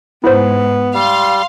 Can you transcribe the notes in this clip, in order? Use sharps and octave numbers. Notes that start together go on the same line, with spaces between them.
G#2 B3 E4 C5
G3 F5 C6